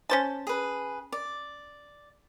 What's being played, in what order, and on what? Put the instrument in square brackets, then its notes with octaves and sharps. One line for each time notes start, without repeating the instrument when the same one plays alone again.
[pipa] C#4 C5 A5
[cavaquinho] G#4 B4
D5